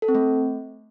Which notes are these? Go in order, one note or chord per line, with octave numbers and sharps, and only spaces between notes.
A4
C4
A3